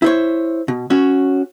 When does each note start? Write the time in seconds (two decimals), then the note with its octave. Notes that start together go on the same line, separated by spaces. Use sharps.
0.02 E4 C5 C#5
0.68 B2
0.90 C#4 F#4 C#5